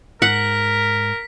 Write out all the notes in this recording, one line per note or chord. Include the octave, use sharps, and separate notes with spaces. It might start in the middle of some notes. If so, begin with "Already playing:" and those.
G#2 A#4 F#5 B6